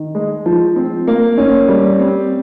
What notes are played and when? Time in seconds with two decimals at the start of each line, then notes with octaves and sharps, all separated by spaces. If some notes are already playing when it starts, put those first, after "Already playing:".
Already playing: D#3
0.15 G#3
0.46 F3
0.76 C4
1.08 A#3
1.38 C#4
1.68 G3
1.99 C4